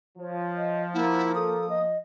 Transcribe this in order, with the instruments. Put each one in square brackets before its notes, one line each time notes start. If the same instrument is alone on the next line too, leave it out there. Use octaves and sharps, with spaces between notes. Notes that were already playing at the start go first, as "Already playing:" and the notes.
[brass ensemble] F3 [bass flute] C#5
[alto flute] D#5
[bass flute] A#3 [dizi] E4 [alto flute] F#5
[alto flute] A4 [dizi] D#6
[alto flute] D#5